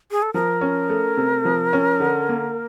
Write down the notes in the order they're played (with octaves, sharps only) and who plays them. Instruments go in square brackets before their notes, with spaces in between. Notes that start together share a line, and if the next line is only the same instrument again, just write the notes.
[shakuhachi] G#4
A4
[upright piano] F3 [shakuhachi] A#4
[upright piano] C#4
A3
C3
F3
C#4
D3
A#3